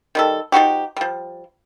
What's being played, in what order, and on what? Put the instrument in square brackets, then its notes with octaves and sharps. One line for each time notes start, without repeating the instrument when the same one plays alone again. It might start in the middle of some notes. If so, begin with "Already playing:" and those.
[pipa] D#3 G3 A4
F3 D#4 F#4 G4
F3 G3